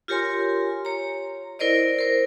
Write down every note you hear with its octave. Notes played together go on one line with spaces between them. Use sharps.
F4 G4 A#4 C#5 G#5 C6
C#5 A#5
E4 A#4 C5 D5 D#5
A#4 C5